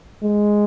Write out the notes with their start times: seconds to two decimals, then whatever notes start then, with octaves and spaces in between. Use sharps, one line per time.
0.23 G#3